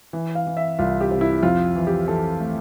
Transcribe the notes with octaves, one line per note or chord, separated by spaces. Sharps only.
E3
F5
E3
E5
C2 F4
G4
C3
E4
F2 F4
E3
G4
E3 A4
A3